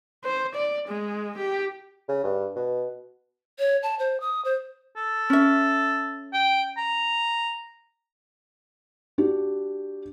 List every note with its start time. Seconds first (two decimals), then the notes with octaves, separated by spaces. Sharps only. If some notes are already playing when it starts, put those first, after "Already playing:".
0.24 C5
0.55 D5
0.88 G#3
1.38 G4
2.08 C#3
2.24 G2
2.56 B2
3.59 C#5
3.83 A5
3.99 C5
4.20 D#6
4.45 C5
4.96 A4
5.30 C#4 E5
6.33 G5
6.77 A#5
9.18 D4 F#4 G4